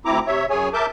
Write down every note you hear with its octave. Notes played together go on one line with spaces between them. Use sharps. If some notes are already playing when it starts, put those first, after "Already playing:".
D2 C4 E4 A#5 D6
C3 C#5 E5
F#2 G#4 C#5 G#5
A#4 E5 A5 D6 G6